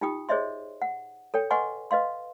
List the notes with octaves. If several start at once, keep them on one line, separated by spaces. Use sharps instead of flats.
D#4 F4 G4 G5 D#6
G#4 C5 C#5 D#5 E5 C6
F#5
A4 C#5 G5
B4 D#5 F#5 G#5 C6 C#6
B4 D#5 F5 C6